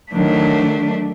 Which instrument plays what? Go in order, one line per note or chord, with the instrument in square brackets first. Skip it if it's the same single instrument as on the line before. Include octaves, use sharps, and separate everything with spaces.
[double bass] D#3 F#3 [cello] A3 D4